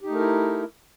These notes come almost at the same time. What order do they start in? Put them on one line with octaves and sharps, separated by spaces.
G4 D#4 A3 A#4 E4